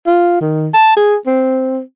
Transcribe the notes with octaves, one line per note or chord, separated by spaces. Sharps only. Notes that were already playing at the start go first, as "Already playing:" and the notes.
F4
D#3
A5
G#4
C4